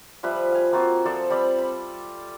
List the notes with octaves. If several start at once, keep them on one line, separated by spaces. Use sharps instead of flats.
F3 G3 B4 E5
F5 G#5
A#3 C4 F4 F#4
F3 A4 C5 D5
G3 C4 D5 B5
B5